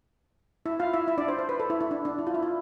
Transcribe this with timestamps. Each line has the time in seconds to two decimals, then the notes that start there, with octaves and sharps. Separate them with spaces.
0.66 E4 E5
0.80 F4 F5
0.93 E4 E5
1.07 E4 E5
1.18 D4 D5
1.28 C5
1.39 C5
1.49 B4
1.60 A4
1.70 E4
1.81 E4
1.91 D4
2.05 D4
2.19 E4
2.27 F4
2.34 E4
2.43 F4